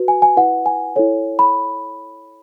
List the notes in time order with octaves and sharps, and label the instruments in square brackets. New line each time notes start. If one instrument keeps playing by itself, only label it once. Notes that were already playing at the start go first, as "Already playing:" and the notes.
Already playing: [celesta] F#4 B4
G#5
G#5
E4 B4 F#5
G#5
E4 A4 C#5
B5